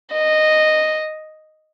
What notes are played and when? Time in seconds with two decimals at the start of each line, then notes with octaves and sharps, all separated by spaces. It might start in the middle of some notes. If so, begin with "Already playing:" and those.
0.14 D#5